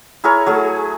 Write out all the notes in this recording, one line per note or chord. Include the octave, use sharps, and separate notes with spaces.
E4 G#4 A#4 C#5
F#3 A3 G#4